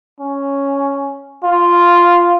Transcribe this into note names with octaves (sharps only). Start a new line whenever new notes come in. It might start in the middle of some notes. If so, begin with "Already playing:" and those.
C#4
F4